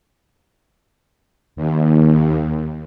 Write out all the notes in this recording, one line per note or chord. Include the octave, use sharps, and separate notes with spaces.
D#2